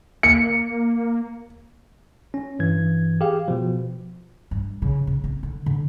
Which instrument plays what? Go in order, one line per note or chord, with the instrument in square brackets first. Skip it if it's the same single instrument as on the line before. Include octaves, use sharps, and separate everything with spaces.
[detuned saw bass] A#3 [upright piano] C#7
[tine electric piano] C#4
G2 E3 G#6
G4 G#4 F5
B2 F3
[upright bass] G2
C#3
C#3
C4
D3
D3